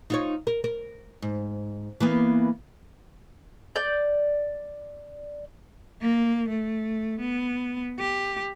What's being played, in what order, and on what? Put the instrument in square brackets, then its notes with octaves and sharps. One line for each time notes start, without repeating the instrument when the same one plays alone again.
[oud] D#4 F4 C#5
A#4
A#4
G#2
E3 A#3 B3
[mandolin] D5 G6
[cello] A#3
A3
B3
G4